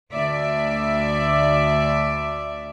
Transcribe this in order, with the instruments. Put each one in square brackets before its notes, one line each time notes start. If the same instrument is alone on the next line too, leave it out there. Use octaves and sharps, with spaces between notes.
[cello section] D2 D5 E5